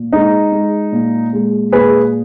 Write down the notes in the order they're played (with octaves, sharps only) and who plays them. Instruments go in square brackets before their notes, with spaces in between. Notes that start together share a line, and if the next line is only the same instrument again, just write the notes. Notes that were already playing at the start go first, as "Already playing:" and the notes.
Already playing: [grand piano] A#2
G#3 D#4
G#3
A#2
G#3
A#2 G#4 B4